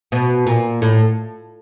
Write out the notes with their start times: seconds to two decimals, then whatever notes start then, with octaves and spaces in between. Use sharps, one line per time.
0.12 B2
0.47 A#2
0.82 A2